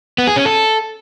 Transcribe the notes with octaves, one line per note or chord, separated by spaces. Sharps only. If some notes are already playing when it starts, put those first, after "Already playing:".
B3
G#4
C#4
A4